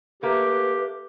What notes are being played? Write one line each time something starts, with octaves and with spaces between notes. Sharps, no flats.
A3 A#3 G4 B4